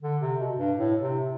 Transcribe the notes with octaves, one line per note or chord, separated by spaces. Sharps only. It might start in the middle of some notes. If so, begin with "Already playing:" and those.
D3
C3
B2
G2
A2
C3